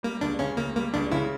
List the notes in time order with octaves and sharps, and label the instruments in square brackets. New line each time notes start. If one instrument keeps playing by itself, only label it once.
[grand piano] G3 [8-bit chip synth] A#3
[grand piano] C#2 [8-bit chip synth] D4
[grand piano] C#3 [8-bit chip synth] C#4
[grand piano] C#2 [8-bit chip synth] A#3
[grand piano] G3 [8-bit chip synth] A#3
[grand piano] C#2 [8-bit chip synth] D4
[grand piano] C#3 [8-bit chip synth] E4